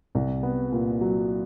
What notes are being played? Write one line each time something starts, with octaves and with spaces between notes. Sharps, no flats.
C2
B3
A#2
F#3